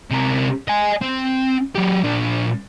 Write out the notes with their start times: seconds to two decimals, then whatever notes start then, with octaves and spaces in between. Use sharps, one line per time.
0.11 C3 A#4
0.68 D#5 G#5
1.01 C4
1.76 F#3 G4
2.04 A#2 D4